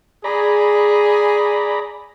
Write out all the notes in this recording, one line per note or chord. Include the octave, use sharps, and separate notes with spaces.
G#4 D5 A#5 B5